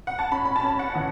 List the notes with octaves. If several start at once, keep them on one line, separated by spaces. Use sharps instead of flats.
F#5
A5
C#4 B5
B5
A5
C#4
F#5
E3